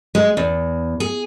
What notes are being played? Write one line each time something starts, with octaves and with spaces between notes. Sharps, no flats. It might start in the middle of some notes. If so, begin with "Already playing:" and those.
G#3
E2
G#4